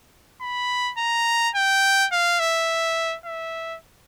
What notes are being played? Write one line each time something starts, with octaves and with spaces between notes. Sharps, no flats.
B5
A#5
G5
F5
E5
E5